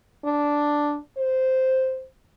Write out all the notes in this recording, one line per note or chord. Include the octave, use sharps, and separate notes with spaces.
D4
C5